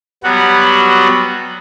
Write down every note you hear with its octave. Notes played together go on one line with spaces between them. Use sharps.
F#3 G3 B3 F#4